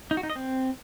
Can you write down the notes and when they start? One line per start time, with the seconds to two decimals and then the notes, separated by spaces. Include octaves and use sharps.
0.11 D#4
0.17 F#4
0.23 D#4
0.30 D#5
0.36 C4